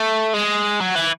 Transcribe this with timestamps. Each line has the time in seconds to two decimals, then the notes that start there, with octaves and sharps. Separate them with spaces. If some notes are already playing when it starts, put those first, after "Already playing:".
Already playing: A3
0.34 G#3
0.80 F#3
0.95 E3